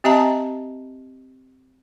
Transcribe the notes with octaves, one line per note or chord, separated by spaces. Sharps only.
C4 G4 D#5 E5 A5 A#5